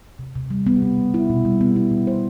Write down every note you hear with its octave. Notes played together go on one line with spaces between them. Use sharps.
C3
C3
G3
B3
C3
C3
E4
B2
G3
B3
E4
B2
C5